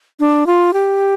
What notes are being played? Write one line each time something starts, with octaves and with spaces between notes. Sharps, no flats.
D4
F4
G4